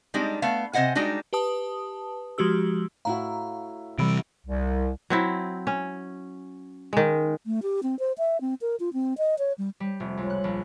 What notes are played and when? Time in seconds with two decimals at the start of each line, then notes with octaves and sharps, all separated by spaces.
0.14 G3 G#3 C4 D4 D#4
0.42 A3 B3 F5
0.73 C3 C5 D#5 F#5 G#5
0.95 G3 G#3 D4 D#4 F#4
1.33 G4 B4 A5 D#6
2.38 F3 G#3 F#4 G4 E6
3.05 A2 E4 F#4 F5 A#5
3.98 C3 E3 G3 D7
4.45 C2
5.10 F#3 C4 E4
5.67 C#4
6.93 D#3 G#3
7.46 A3
7.63 G4
7.83 C4
7.99 C5
8.18 E5
8.41 C4
8.61 A#4
8.80 F4
8.93 C4
9.18 D#5
9.39 C#5
9.58 G3
9.80 G3
10.00 F1
10.17 C#2
10.30 F#6
10.44 A#1